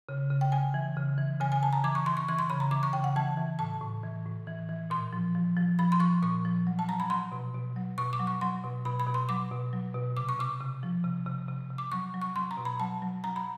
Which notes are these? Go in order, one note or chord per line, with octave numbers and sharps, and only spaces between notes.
C#3
C#3
G5
C#3 G#5
E3
C#3
E3
C#3 G#5
G#5
C#3 A5
A#5
E3 D6
C#6
E3 C6
C#6
E3 C#6
C6
C#3 B5
A#5
E3 D6
C#6
C#3 G5
F#5
E3 A5
E3
A2 A5
A2
E3
A2
E3
E3
A#2 C6
F3
F3
F3
F3 B5
C6
F3 C#6
A#2 C#6
F3
F#3
A5
F#3 A#5
B5
F#3 C6
B2
B2
F#3
B2 C#6
D6
F#3
C#6
F#3 C6
B2
B2 B5
B5
B2
C6
F#3 D6
B2
F#3
B2
C3 D6
C#6
C3 D6
C3
F3
C3
C3
C3
C3
D6
F#3 C#6
F#3
C#6
F#3 C6
A#5
B2
B5
F#3 A5
F#3
F#3 A#5
B5